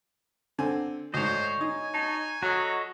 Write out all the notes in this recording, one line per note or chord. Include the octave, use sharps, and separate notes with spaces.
D3 C4 G#5
D2 G#2 C5 C#5 D#5
D#4 G#5
D#4 A5
F#3 F#4 A4 D#5